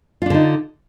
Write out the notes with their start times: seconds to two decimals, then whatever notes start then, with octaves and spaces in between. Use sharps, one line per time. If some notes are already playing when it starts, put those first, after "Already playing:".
0.22 F4
0.26 D4
0.30 D3
0.34 D#4